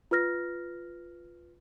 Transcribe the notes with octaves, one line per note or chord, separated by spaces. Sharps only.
F4 B4 F6 A#6